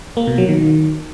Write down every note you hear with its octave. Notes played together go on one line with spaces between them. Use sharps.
A#3
B2
F#3
D#3